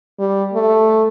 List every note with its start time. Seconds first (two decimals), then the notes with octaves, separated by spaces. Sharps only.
0.19 G3
0.54 A3